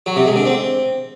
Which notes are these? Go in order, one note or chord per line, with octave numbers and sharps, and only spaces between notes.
F#3
C3
G#3
D3
C4